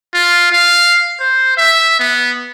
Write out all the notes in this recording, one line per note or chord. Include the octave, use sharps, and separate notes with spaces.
F4
F5
C5
E5
B3